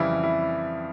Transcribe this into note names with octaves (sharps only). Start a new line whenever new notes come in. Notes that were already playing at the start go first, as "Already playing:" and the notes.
Already playing: F2 C#3 E3 G3 E4
E4